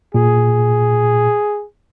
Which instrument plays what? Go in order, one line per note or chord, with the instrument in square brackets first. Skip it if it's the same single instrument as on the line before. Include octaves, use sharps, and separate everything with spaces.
[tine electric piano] A#2 [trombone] G#4